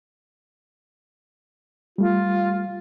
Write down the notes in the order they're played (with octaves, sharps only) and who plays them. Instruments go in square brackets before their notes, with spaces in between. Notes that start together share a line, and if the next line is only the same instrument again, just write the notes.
[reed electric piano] G3 A3 [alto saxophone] F4